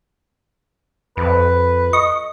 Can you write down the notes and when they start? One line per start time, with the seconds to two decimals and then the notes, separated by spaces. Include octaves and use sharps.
1.17 F2 B4
1.93 D#5 C#6